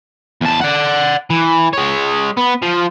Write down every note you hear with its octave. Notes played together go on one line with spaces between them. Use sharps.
E2 A5
D5 F#5
E3
G#3 C#5
B3
F3